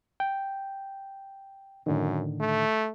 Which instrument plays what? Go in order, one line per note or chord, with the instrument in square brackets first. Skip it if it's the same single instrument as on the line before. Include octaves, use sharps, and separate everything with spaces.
[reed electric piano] G5
[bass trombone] F#2 [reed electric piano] A2 D3 D#3
[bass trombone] A3